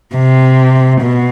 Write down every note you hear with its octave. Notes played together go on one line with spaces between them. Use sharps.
C3
B2